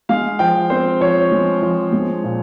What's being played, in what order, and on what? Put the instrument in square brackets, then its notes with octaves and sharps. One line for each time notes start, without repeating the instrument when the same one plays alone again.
[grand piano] G#3 F5
F3 G5
C4 C5
F3 C#5
G#3
F3
G#3
A#2